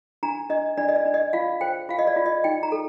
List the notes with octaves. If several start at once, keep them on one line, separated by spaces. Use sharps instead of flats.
D4 A#5
D4 D#5
D4 D5
D#5
D5
D4
D#5
F4 F5
C5 G5
F4 F5
D#5
D5
F4
D#5
D#4 G5
A#5
A4